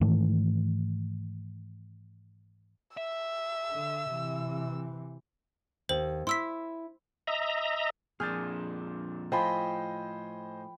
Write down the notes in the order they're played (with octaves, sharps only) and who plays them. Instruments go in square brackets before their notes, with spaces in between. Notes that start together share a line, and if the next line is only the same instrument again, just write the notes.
[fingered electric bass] G#2 D#3 E3 A3
[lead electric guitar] E5 [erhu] E6
[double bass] D3
C3 E3
[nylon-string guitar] D#2 [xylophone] C5 F#7
[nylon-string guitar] E4 [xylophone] C6 E6 B6
[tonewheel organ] D#5 E5 A#5
[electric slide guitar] F2 A#2 D4 [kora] G#4 [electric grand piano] F6 G6 A6
[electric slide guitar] A2 [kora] F3 [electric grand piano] C5 D#5 G#5 [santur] G5 B5